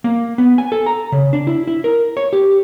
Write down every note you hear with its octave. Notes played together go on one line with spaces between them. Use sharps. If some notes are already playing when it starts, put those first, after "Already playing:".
A#3
B3
G#5
A4
A#5
C#3
D4
E4
E4
A#4
C#5
G4